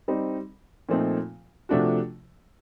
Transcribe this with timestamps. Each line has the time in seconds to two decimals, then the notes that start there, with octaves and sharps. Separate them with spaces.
0.08 G3 C4 D#4
0.89 A#2 F3 A3 C4 D#4
1.69 C3 F3 A3 D4 F#4